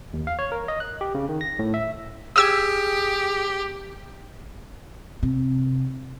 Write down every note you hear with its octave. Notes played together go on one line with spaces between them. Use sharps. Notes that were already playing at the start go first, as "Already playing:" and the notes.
D#2
F5
C#5
A#4
D#5
F#6
G4
C#3
D#3
A#6
A2
E5
G4 G#4 D#6 E6 G#6
C3